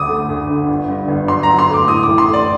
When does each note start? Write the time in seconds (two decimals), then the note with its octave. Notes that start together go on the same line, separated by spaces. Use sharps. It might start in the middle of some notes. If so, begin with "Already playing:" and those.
Already playing: D2 D3 D6 D#6
0.09 A3
0.29 D2
0.49 D3
0.68 G1
0.89 G2
1.08 G1
1.28 F#3 C6
1.43 A#5
1.48 F#3
1.59 C6
1.69 A3 D6
1.88 A2 D#6
2.03 D6
2.09 A1
2.18 C6
2.28 A3
2.33 D5